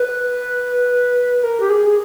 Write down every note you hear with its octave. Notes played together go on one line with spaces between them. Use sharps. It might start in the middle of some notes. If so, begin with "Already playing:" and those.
Already playing: B4
A#4
G4
G#4